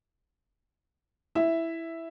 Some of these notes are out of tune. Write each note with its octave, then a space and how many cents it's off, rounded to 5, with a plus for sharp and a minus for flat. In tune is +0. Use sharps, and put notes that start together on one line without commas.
E4 +0 E5 +0